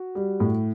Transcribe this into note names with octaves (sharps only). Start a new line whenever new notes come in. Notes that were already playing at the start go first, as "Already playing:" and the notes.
Already playing: F#4
G3
A2